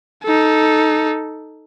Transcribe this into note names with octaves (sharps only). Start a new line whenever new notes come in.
D#4 A4